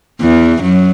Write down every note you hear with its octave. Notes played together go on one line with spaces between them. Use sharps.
E2 E3
F#2 F#3